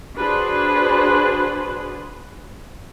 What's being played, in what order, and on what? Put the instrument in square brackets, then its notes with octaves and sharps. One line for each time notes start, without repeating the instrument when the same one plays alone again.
[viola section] D4 F#4 G#4 B4 C5